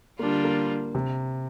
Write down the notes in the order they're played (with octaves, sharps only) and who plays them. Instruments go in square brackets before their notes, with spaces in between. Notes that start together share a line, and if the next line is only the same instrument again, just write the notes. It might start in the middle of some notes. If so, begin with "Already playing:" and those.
[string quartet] D3 G3 D4 F4 [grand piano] A#3
[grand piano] A#3
C3